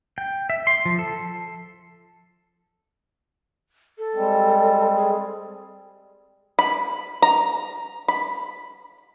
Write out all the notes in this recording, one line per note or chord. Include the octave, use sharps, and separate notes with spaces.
G5
E5
C6
F3
A4
A4
G3 G#3 C4
G#4
B5
A#5
B5